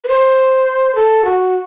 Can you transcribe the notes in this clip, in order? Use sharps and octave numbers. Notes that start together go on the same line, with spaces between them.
B4
C5
A4
F#4